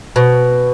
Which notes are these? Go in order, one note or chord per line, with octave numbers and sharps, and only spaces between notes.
B2